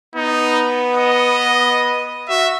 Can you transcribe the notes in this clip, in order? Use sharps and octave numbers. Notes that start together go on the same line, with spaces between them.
B3 D#4
D#5
F#4 E5